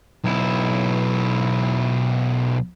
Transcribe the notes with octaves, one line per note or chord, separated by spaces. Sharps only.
B1 E4